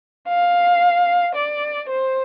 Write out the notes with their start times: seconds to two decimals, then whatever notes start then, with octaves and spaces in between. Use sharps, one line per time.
0.28 F5
1.35 D5
1.89 C5